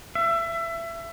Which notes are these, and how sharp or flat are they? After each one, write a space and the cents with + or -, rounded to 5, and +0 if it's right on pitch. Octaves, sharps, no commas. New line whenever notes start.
E5 +25